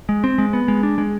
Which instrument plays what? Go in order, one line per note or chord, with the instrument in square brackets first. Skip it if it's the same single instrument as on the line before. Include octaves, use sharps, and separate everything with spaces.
[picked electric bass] G#3
C4
G#3
B3
G#3
D4
G#3